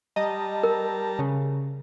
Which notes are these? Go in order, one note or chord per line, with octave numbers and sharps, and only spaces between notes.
G3 D#5 A5 A#5
A#4
C#3